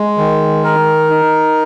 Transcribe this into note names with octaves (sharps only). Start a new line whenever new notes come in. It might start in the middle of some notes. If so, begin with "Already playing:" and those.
Already playing: G#3
D#3
A#4
D#4